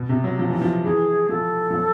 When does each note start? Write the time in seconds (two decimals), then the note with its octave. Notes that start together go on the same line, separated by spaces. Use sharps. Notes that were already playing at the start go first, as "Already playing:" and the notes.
Already playing: B2
0.09 C3
0.24 F#3
0.39 F3
0.50 E3
0.61 F3
0.84 E3 G#4
1.29 F3 A4
1.70 F3
1.75 F#3